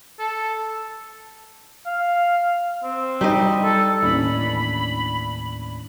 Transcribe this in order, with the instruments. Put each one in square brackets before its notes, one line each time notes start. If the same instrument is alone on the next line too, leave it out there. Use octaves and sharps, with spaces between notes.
[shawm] A4
[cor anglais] F5
C4
[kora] G3 D#4 D#5
[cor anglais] A4
[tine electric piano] D#2 A2 [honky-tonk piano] E3 C#4 D4 [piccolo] B5